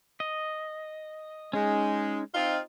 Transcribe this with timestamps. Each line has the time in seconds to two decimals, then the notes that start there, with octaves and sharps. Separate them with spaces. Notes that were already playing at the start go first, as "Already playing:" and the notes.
0.20 D#5
1.53 G#3 C#4 D#4
2.34 C4 D#4 F4